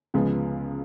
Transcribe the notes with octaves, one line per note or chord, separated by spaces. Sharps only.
C#2 C#3 F3 G#3 B3